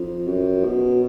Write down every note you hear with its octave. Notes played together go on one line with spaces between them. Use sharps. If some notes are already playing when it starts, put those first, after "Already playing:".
Already playing: F2
F#2
B2